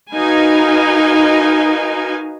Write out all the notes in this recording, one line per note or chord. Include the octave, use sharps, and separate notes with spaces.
D#4 F#4 A#4 B4 F5 G#5